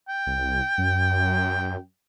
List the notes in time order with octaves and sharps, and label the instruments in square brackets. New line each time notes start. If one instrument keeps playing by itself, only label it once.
[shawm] G5
[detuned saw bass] C2
F#2